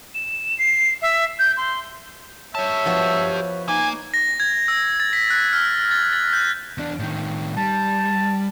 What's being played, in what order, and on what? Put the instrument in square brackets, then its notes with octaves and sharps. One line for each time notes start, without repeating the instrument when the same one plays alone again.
[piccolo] E7
C7
E5
G6
C6
[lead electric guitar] G4 A5 [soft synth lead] C#5 [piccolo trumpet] E5
[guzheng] F3 B3 F#4
[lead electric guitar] A#3 [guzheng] D#4 [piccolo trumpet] G#5
[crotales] A#6
G#6
E6
A6
B6
F#6
F6
A6
A6
G6
[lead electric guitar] E2 D4
A2 D#3
[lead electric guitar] G3 [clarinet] A5